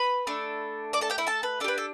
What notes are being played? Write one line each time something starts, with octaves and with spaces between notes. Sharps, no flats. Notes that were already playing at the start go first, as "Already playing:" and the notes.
Already playing: B4 B5
A3 D4 A4
D5 D6
A4 A5
G4 G5
E4 E5
A4 A5
B4
D4 G4 A4 B4
A4